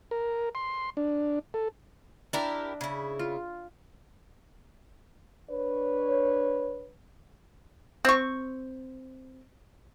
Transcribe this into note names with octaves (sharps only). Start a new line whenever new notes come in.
A#4
C6
D4
A4
D4 E4 G4 A#4 E5 A#5
C#3 E4
F4
D4 B4 C#5
C4 C#6